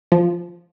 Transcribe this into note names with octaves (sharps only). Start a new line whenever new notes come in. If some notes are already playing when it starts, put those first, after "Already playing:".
F3